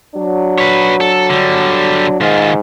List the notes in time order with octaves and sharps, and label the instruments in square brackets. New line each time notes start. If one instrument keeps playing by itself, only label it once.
[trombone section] F#3 D4
[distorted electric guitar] B4 C#5
A4
D3 G3
[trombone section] G#2 [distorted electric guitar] D#3 F4